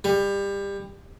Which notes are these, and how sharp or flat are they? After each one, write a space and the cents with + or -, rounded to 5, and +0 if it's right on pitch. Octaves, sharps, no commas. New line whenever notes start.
G3 +25